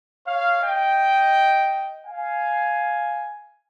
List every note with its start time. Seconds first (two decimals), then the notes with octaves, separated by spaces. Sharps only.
0.26 C#5 F5
0.62 D#5 G5
2.04 F5 G#5